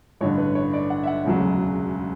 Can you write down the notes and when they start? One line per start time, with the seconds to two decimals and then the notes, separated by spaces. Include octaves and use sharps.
0.21 A1 G2 D3 C#5
0.38 B4
0.55 C#5
0.73 D5
0.90 F#5
1.03 E5
1.07 F#5
1.24 E1 D2 C#3 F#3